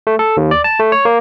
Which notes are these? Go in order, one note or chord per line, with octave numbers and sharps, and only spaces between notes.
A3
A4
D#2
D5
A5
A3
C#5
A#3